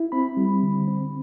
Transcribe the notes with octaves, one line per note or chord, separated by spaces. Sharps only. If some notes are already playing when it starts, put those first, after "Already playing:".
Already playing: E4
C4 B5
G3
D3
C4